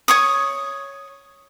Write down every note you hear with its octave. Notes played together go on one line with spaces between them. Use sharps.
C#5 C#6 D#6